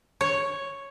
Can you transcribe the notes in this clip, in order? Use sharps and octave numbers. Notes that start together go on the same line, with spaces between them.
C#5